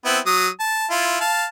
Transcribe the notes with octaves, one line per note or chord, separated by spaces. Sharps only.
B3 C4 E4
F#3 D#6
A5
E4 F4
F5 A5